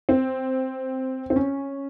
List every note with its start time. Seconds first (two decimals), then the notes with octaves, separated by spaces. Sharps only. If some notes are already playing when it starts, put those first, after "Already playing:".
0.09 C4
1.30 C4
1.36 C#4